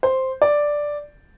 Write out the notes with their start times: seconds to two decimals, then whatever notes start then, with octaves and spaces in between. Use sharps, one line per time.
0.03 C5
0.42 D5